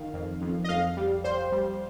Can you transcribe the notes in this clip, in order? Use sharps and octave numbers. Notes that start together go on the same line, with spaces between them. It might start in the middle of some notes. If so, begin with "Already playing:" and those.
Already playing: D#3 F5
F2
F2
D#5
F2 F5
G3
G3 C5
G3